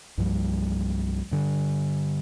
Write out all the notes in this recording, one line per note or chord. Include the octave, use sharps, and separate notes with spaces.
C2 G2 F3 G3
G2 D3